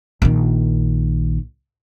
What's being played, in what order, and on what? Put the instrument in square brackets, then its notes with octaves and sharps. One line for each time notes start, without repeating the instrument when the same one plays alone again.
[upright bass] A#1 D#3